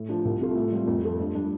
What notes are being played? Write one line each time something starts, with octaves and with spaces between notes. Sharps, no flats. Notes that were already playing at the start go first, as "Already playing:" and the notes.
Already playing: A2
F3 D4
C2
C3 A3 F4
A2
G3 C4 F4
F2
F3 A3 F4
G2
G3 D4